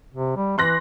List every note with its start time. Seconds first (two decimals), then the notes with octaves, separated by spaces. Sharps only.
0.14 C3
0.36 G3
0.58 E3 C6 F#6 A#6